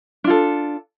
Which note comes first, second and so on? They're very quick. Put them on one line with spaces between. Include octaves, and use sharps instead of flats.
D4 F4 A4